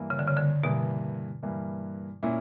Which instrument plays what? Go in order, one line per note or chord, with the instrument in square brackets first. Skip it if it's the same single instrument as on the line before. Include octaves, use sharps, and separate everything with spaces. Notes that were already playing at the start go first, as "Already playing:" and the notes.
Already playing: [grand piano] G2 E3 A#3
[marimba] C#3
D3
C#3
D3
[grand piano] G2 E3 A#3 [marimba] B2
[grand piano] G2 E3 A#3
A#2 A#3 C#4 E4